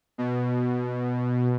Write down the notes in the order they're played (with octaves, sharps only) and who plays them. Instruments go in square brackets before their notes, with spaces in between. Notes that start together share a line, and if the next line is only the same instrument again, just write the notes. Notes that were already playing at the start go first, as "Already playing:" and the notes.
[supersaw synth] B2